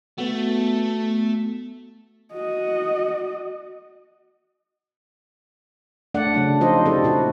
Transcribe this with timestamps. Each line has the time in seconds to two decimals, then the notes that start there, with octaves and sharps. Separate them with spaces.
0.18 A3 B3 F#4
2.33 F#4 D#5
6.14 A3 D4 D5 F#5
6.34 C#3 F#3 D4
6.61 F3 D#4 F4 C5 D#5
6.86 C4 D4 E4 G4 A4
7.04 A#2 E4 F#4